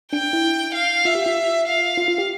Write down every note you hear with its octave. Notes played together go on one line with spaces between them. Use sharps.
D4 G5
E4
F5
F4 E5
G4
F4
F5
F4
F4
G4